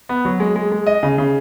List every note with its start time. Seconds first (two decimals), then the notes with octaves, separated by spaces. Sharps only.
0.09 B3
0.25 F#3
0.40 G#3
0.56 G#3
0.72 G#3
0.86 D#5
1.03 C#3
1.18 C#3